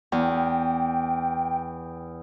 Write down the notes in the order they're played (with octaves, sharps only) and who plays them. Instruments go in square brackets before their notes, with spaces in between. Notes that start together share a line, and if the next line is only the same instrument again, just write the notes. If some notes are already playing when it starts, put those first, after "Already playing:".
[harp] E2 [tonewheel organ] G5